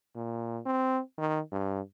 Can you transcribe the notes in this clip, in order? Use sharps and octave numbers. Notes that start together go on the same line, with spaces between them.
A#2
C4
D#3
G2